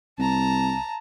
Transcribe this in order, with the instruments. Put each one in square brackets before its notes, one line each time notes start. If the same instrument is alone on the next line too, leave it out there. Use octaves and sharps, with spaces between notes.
[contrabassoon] C2 [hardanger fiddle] A5 A#5